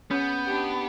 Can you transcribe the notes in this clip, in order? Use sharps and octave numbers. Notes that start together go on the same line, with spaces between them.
B3 C#4 G6
D4 G4